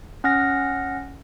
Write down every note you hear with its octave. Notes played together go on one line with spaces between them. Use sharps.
C#4 F#5 F6 A#6